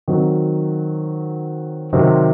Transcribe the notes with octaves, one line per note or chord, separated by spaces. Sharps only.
D#3 F#3 C4
C3 D#3 F#3 C4